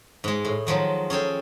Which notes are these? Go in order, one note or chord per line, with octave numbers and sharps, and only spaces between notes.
G#2 G#3
A2
D#3 F3 F#3 G#3
C#4 G#4 A4 G5